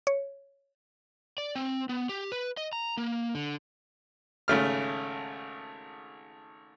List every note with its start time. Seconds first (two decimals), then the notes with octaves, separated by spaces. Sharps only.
0.07 C#5
1.38 D5
1.55 C4
1.89 B3
2.09 G4
2.32 B4
2.57 D#5
2.73 A#5
2.97 A#3
3.35 D3
4.48 G#1 C#3 A3 F6